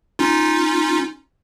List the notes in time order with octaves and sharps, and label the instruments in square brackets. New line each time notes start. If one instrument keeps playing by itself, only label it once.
[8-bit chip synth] C#4 D#4 F4